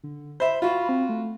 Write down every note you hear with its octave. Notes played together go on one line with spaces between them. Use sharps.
D3
C5 E5 B5
F4 F#4
C4
A3